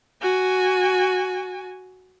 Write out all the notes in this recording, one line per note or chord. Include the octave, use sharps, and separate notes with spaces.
F#4 G#5